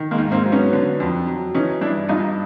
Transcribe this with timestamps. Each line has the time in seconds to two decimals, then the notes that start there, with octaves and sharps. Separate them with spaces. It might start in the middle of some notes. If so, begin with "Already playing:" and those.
Already playing: D#3
0.11 G#3 A#3
0.18 G#2
0.31 A#3 C4
0.45 F#3
0.52 B3 C#4
0.73 D3
1.00 F2
1.27 F#3
1.54 E3 C#4 D#4
1.81 G2 D4 E4
2.08 G2 D#4 F4